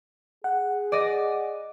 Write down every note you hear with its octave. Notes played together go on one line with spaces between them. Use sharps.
G#4 F#5
D5 D#5